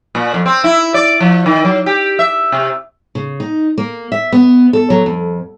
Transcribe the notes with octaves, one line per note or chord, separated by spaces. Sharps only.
A#2
F2
C4
E4
D5
F3
D#3
F#3
G4
E5
C3
C#3
D#4
A#3
E5
B3
A4
F#3
F2